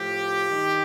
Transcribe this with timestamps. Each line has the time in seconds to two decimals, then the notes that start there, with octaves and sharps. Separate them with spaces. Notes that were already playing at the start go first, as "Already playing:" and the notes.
Already playing: A2 F3 G4
0.46 G2 D#3